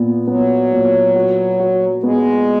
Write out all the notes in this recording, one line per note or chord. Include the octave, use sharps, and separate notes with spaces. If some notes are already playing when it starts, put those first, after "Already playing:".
Already playing: A#2 B3
F#3 B3
A#2
F#4
F#4
G#3 B3